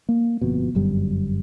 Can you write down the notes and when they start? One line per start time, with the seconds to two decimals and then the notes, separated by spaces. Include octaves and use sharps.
0.09 A#3
0.41 G1 F2 B2
0.75 G1 F#2 G3